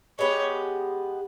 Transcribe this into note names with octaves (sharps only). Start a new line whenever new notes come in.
G#3 B3 G4 C#5